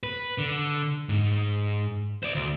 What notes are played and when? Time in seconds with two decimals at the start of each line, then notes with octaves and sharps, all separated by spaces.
0.03 B4
0.38 D3
1.09 G#2
2.23 C5 D5
2.35 D2